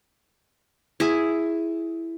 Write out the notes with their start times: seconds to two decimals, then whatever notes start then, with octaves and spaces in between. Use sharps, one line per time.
1.00 E4 G#4